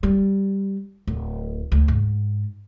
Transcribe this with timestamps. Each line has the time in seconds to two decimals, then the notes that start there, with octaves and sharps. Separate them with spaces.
0.03 G3
1.07 D1
1.72 D2
1.88 G#2